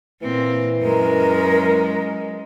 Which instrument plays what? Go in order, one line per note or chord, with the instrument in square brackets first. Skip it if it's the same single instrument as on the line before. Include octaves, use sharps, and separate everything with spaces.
[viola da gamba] A#2 C4 [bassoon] E3
[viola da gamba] F#2 G#3 [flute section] A#4